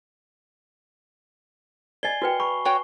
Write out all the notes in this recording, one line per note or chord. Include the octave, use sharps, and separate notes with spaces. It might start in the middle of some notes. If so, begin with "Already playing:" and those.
D5 D#5 G#5 C7 G7
F#4 B4 G5
B5 C#6
F#4 C#5 G5